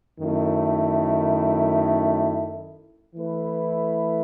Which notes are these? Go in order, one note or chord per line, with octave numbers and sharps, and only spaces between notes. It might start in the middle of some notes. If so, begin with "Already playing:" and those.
F#2 D#3 A3 E4
E3 A3 E4 B4